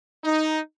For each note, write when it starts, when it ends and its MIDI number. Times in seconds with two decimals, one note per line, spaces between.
0.24 0.58 63